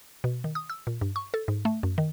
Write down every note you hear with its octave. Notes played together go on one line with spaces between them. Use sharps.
B2
D#3
D#6
E6
A#2
G2
C#6
A4
G#2
A3
F#2
D#3